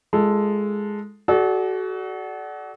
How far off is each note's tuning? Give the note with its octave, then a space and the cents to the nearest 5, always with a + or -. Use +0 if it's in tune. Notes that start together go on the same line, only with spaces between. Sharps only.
G#3 +0 F4 -30 A4 +0
F#4 +20 A4 -45 D5 +0